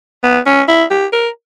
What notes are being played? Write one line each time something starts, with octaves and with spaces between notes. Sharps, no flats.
B3
C#4
E4
G4
A#4